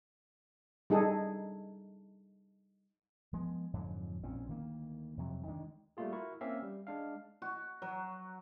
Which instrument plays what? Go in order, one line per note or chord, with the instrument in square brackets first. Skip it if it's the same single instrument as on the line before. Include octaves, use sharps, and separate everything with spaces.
[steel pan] G3 D#4 G#4 A4
[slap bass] F3 G#3 B3
F2 G#2 D3 F#3
A#1 A#2 C4 C#4
D2 D#3 A#3
F2 C3 F#3
D2 D#3 G#3 D4
[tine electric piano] G3 A3 A#3 F4 G#4
E4 F#4 A#4 C#6
A#3 C4 C#4 E5 F5
G3
G#3 D4 F5
[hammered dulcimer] F#4
F#3